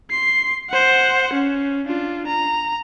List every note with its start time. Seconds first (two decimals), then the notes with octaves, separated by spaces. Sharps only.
0.11 C6 C7
0.70 C5 F#5
1.33 C#4
1.87 D4 F4
2.27 A#5